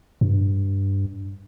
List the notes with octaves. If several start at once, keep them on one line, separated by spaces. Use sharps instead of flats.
G2